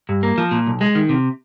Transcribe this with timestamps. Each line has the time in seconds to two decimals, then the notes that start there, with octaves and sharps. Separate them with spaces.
0.09 G2
0.23 A#3
0.38 F3
0.51 A#2
0.66 B1
0.81 G#3
0.95 D#3
1.09 C3